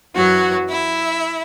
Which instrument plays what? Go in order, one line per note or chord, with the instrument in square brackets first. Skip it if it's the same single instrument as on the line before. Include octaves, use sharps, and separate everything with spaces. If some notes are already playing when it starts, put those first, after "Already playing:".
[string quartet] F#2 E3 F#3 F#4
E4 E5